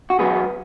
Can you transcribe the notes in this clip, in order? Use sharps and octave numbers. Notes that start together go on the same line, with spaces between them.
F#4
E2 B2 F#3 B3 G#4